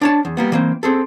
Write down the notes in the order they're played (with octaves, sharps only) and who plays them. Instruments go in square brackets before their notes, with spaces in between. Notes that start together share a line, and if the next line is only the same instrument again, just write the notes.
[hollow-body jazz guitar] D4 C#5 A5
E2
G3 A#3 B3
E3 A#3 C4
C4 G#4 A4